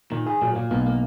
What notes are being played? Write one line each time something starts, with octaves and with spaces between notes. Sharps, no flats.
A#2 D#3
G#4
A#2 F#3
A#2 A#3
B1 B2 A#3
A#3